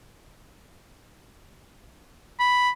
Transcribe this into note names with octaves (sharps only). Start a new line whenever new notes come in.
B5